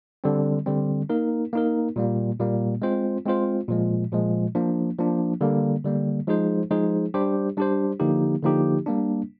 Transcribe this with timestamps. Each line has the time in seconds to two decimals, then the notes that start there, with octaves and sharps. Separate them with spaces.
0.24 D3 G3 C4
0.66 D3 G3 C4
1.09 A#3 D#4 A#4
1.53 A#3 D#4 A#4
1.96 A#2 G3 A#3
2.39 A#2 G3 A#3
2.82 G#3 C4 F4 C5
3.25 G#3 C4 F4 C5
3.69 A#2 F3 G#3
4.12 A#2 F3 G#3
4.55 F3 A#3 D4
4.98 F3 A#3 D4
5.41 D3 G3 A#3
5.84 D3 G3 A#3
6.27 F3 G#3 D#4 G#4 C5
6.71 F3 G#3 D#4 G#4 C5
7.14 G3 D4 G4 C5
7.57 G3 D4 G4 C5
8.00 D3 F3 A#3 D#4 G4
8.43 D3 F3 A#3 D#4 G4
8.86 G3 A#3 D4